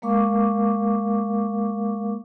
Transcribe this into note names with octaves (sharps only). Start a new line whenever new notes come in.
G#3 A#3 A#4 F5 C#6 D6